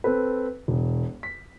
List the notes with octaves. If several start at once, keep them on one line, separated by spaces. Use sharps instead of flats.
C4 A4 B4
E1
B6